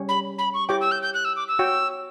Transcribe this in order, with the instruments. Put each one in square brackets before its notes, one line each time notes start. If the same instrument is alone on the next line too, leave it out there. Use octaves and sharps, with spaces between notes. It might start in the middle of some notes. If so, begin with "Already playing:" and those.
Already playing: [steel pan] G3 C#4 G4 C#5
[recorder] B5
B5
C#6
[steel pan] E4 G4 C#5 G5 [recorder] D6
[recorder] E6
G6
G6
F#6
E6
D6
E6
[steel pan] F#4 C#5 G5